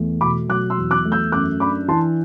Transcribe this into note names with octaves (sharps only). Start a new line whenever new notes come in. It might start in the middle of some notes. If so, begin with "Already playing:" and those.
Already playing: E2 A3
B2 B5 D6
F#3 D6 F#6
C6 E6
E2
D6 F#6
A3
E6 G6
F#2 D6 F#6
D4 B5 D6
E3 A5 C6